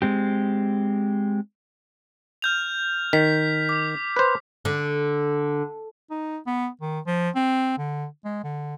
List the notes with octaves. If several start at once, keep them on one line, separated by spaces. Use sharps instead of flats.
G#3 C4 G4
F6 G6 F7
D#3 B6
D6
B4 C5
D3
D#4
B3
D#3
F3
C4
D3
G#3
D3